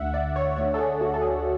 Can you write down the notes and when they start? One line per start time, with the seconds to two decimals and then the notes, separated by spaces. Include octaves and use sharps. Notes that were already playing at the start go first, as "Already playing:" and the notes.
Already playing: D2 D3 E5 F#5
0.14 D5
0.36 C#5
0.57 D2 D3 C#5
0.74 A4
0.78 G#4
1.01 F#4
1.14 A4
1.21 G#4